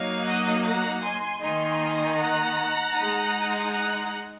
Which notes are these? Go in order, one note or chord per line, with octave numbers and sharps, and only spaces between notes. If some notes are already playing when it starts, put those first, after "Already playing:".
Already playing: F#3 A#3 D#4 C#5 F5
D#5 F#5
F#5 A#5
G#5 C6
D#3 A#3 D#4 G#5 C6
F#5 A#5
G#3 D#4
F#5 A#5